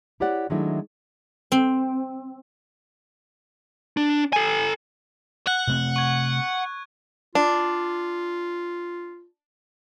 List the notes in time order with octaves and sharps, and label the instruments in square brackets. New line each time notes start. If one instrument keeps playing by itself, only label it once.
[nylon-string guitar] E4 G4 C#5 D5 F#5
D#3 F#3 G#3 A3 D4 E4
[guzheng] C4
[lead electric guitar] D4
A4 G#5
[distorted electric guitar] F#5 [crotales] F#6
[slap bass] C3 A3 C4
[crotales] C#6 G#6
[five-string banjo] D4 [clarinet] F4